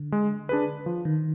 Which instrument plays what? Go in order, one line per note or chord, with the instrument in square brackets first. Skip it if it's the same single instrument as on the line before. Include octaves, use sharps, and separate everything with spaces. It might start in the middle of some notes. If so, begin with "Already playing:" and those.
Already playing: [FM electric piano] D3
[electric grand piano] G#3
D4 G#4 B4
F3
[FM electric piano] D#3